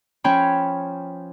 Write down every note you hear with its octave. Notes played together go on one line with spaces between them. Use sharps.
F3 C#4 C#5 G5 B5